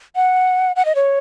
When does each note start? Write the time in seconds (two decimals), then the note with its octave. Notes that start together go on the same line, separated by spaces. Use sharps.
0.16 F#5
0.76 F#5
0.85 D#5
0.95 C#5